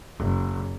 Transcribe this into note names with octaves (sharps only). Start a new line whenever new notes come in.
F#1